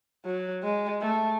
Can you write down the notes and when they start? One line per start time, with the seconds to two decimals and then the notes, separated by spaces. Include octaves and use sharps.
0.25 F#3
0.63 G#3
1.02 A3